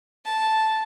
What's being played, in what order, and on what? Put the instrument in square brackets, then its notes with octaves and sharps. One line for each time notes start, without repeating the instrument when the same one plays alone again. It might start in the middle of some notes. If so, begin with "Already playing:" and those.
[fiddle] A5